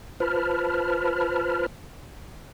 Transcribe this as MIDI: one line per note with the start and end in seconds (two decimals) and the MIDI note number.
0.20 1.66 65
0.20 1.66 71
0.20 1.66 72
0.20 1.66 81
0.20 1.66 83
0.20 1.66 89